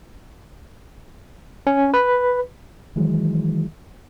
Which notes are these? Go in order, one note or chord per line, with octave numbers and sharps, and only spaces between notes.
C#4
B4
D#3 E3 F#3 G#3